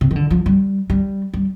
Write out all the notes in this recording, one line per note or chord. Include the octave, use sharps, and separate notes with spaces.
C3
D#3
D3
F3
G3
G3
G3